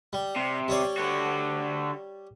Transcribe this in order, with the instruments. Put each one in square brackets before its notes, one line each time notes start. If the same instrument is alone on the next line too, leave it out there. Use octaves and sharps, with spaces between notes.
[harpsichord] G3
[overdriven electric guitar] C3
[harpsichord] G3 C#5 D5
[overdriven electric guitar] D3 F#4